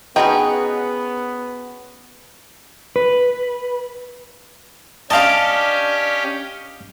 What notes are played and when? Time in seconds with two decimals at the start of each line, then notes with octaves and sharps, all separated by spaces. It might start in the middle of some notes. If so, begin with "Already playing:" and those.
0.16 B3 C#4 D#4 F#4 G#4 B4 G5
2.96 B4
5.10 C#4 D4 G4 D#5 F5 A5 D6